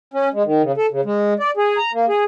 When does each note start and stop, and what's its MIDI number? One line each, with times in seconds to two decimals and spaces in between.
0.14 0.29 61
0.34 0.43 56
0.45 0.62 51
0.62 0.72 49
0.77 0.86 69
0.91 1.01 49
1.05 1.33 56
1.39 1.51 74
1.57 1.77 68
1.78 1.91 82
1.93 2.05 58
2.09 2.24 68